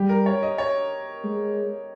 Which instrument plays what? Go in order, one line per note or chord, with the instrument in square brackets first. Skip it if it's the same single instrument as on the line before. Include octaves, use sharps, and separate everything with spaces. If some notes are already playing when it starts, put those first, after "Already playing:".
Already playing: [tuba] G3 [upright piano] G4
[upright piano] A#4
C#5
D#5
C#5
[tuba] G#3